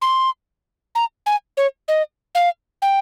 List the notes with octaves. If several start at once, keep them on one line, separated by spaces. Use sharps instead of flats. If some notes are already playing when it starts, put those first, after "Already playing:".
C6
A#5
G#5
C#5
D#5
F5
G5